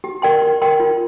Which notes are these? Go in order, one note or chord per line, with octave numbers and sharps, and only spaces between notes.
G4
A#4 D5 G5 C6
G4
A#4 D5 G5 C6
F4